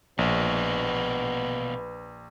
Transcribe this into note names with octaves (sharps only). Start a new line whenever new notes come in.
A#1 B2 A#3 B4